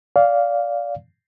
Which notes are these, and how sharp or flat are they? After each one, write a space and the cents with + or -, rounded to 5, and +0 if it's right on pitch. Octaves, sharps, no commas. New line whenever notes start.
D5 -25 F5 +0